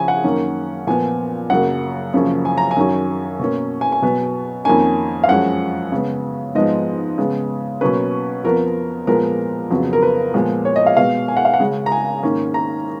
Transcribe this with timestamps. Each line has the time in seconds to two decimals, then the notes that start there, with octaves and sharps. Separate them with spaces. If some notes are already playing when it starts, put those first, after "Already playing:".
Already playing: C#3 F3 C#4 G#5
0.08 F#5
0.24 F#2 D#3 A#3 C#4
0.87 A#2 F3 B3 G#5
1.50 F#2 C#3 F#3 A#3 F#5
2.14 F#2 C#3 F3 A#3 C#4
2.45 G#5
2.58 A#5
2.71 G#5
2.77 F#2 D#3 F#3 C#4
3.40 B2 A#3 C#4
3.81 G#5
3.92 G#5
4.02 B2 F#3 B3
4.65 F2 D#3 A#3 C#4 G#5
5.24 F5
5.29 F#2 F3 G#3 C#4 F#5
5.92 C#3 G#3 B3
6.55 G#2 F3 G#3 B3 D#5
7.18 C#3 G#3 B3
7.81 B2 F#3 A#3 C#4 B4
8.44 F2 F3 B3 A#4
9.07 A#2 F3 G#3 B3 A#4
9.71 F2 C#3 F#3 B3
9.93 A#4
10.02 B4
10.34 A#2 F3 G#3 B3
10.65 C#5
10.76 D#5
10.87 F5
10.97 B2 G#3 B3 F5
11.28 G#5
11.37 F#5
11.45 F5
11.54 F#5
11.60 C#3 G#3 C#4
11.86 A#5
11.92 G#5
12.23 G#2 D#3 A#3 C#4
12.54 A#5